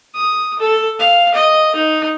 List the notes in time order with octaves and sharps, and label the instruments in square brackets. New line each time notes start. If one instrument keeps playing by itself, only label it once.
[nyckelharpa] D#6
A4
F5
D#5
D#4